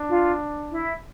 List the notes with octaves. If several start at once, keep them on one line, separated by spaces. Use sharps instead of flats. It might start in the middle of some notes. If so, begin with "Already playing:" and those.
Already playing: D4
F4
E4